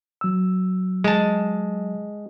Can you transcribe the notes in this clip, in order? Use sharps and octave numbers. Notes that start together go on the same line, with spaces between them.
F#3 E6
G#3 A5